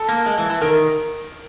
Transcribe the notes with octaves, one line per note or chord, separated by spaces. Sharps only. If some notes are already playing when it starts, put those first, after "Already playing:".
Already playing: A4
A#3
G#3
E3
E3
D#3 A#4